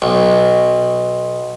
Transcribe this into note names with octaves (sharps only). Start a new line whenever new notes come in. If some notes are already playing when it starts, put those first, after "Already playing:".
B1